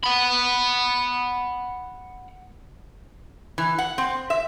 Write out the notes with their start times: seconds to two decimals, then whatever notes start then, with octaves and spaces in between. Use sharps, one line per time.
0.03 F#5 B5
3.58 E3
3.78 F#5
3.98 C4
4.30 E5